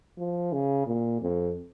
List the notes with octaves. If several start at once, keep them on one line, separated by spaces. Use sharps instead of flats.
F3
C#3
A#2
F2